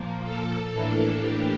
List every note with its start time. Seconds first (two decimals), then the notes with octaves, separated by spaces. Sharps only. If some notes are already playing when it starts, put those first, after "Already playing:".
Already playing: A#2 F3 A#3
0.23 A4
0.71 A2 E3 A#3 D4
1.20 G4